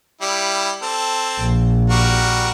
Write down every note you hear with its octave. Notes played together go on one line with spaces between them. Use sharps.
G3 E4
C4 A4
A#1
G3 F#4 A#4